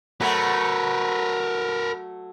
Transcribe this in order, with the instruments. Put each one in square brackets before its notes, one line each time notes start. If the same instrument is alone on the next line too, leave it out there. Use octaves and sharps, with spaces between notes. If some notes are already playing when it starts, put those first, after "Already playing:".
[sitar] F#3 A3 [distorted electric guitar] A#4 B4